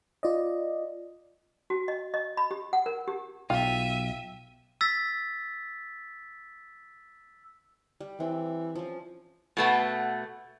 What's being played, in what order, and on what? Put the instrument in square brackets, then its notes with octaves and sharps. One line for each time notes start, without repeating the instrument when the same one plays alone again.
[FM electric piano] F4 D5 D#5
[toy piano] F#4
D#5
D#5
B5
G4
F#5
A#4
G4
[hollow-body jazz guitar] B1 [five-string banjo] F4 [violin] E5 D#7 [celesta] G5
[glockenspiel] E6 A6 B6
[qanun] G3
[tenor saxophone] E3 [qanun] C4
[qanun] F3 C#4
[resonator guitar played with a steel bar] B2 A3 B3